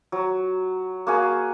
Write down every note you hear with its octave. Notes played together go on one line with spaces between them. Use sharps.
F#3
A#3 F#4 G#4